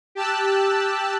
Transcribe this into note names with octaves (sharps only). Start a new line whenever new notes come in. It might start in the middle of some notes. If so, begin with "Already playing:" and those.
G4 A5 E6 F#6